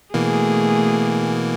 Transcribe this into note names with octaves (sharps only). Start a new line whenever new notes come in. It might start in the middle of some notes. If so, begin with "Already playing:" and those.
B2 E3 A3 A#3 G#4